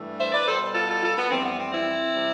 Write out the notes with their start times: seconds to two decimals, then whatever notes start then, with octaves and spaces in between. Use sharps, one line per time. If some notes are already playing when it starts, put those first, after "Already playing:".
Already playing: G2 E3 A3
0.18 C5 E5
0.32 B4 D5
0.46 B2 G3 A4 C5
0.74 F4 A4
0.88 F4 A4
1.02 F4 A4
1.17 B3
1.30 F2 E3 G3 C4
1.44 B3
1.58 C4
1.72 C4 E4
2.15 C3 G3